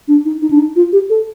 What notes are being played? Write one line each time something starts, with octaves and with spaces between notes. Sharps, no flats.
D4
D#4
D#4
D4
D#4
F4
G4
A4